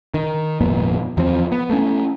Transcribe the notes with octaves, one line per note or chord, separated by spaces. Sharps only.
D#3
G#1 F2 A#2 B3
E2 F3 C4
B3
A3 C#4